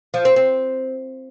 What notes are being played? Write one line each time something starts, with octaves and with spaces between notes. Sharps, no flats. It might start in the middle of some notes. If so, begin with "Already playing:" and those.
F3
C4
C4